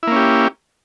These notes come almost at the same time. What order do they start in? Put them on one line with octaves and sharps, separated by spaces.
E4 A#3 C#4 G4